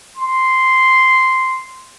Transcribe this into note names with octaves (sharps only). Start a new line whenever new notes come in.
C6